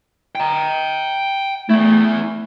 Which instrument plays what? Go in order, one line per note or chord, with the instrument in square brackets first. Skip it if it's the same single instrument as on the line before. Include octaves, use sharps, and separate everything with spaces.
[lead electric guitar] G5 A#5
[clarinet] A3 [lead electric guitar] B3 E4